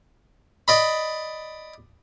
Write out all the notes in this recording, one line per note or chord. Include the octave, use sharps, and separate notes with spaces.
D5 D#5 B5